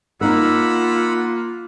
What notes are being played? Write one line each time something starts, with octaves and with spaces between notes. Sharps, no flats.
A#3 D#4 F4 A#4 F#5 B5 E6